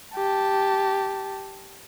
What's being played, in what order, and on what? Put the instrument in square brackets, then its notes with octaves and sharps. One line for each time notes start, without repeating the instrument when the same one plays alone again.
[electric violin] G4 A5